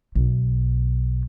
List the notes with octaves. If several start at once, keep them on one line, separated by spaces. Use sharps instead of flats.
B1